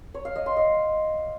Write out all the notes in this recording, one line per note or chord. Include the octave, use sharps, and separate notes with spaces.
C#5
F5
D#5
C6
D#5